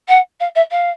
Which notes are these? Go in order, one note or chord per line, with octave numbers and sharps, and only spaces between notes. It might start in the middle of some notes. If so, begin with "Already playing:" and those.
F#5
F5
E5
F5